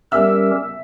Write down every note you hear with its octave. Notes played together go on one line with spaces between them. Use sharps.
G3 C#4 G4 A#4 E5 E6